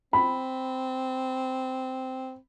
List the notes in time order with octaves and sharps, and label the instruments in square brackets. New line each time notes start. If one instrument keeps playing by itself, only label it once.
[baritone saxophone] C4 [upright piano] B5